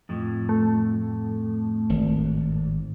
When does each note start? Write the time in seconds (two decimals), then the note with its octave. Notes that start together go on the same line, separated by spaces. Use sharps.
0.09 F2 A2
0.49 A3
1.90 G#1